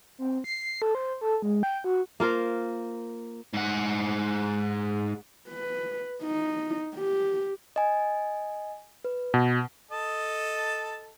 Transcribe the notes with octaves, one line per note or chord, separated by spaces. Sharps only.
C4
C7
A4
C5
A4
G#3
G5
F#4
A#3 F4 A#4 C5
G#2 F#5
B4
D#4
G4
D#5 G#5
B4
B2
A4 D#5 A5